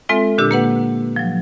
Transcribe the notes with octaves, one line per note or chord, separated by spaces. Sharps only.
G#3 C4 F4 A4 E5
A#2 D3 D4 G4 E6
A#3 B4 F#5
F3 F#3